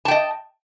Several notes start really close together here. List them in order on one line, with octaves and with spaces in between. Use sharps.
A5 G5 D#5